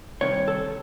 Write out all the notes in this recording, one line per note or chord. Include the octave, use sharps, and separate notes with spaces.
C2 C3 D#3 C#5
A4